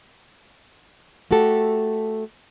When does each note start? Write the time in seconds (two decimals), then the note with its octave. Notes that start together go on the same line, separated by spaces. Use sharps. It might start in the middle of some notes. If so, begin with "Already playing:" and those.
1.31 A3 F#4 G4 A4